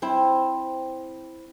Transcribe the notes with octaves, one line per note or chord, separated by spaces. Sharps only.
C4 E4